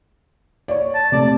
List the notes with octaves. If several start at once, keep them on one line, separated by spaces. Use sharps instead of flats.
C#5 D5
A5
C3 A3 D5